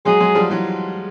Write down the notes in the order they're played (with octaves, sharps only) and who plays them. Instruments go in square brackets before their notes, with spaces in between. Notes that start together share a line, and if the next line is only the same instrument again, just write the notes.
[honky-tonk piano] F#3 G#3 [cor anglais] G#4
[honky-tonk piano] F#3 G#3
F3 G3
E3 F#3